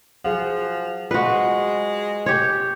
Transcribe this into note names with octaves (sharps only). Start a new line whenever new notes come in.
F3 F#3 G#4 F#5
G#3 F4 F#4 B4 C5
G4 C#5